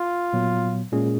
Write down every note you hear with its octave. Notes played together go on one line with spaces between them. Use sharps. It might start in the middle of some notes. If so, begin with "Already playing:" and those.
Already playing: F4
A#2 F#3 B3
A#2 G#3 C#4 G#4